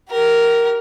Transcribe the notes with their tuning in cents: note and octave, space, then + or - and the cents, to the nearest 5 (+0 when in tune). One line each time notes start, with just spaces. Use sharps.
G4 -40 A#4 +0